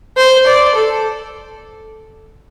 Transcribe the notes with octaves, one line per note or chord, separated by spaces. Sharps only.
C5
D5
A4